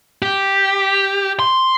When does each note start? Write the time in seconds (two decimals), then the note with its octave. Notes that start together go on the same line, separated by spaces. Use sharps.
0.22 G4
1.39 C6